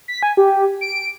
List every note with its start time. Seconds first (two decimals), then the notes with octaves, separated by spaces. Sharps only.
0.08 B6
0.23 G#5
0.37 G4
0.81 D7